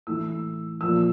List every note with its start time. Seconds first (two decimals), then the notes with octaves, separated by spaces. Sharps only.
0.07 A2 E3 E6
0.81 A#2 F3 E6